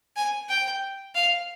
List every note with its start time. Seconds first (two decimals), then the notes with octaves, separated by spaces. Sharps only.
0.17 G#5
0.49 G5
1.15 F5